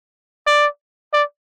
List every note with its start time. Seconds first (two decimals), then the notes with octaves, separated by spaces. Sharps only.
0.47 D5
1.13 D5